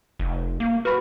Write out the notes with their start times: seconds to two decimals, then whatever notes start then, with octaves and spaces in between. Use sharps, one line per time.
0.19 F1
0.60 A#3
0.85 F#4 B4 B5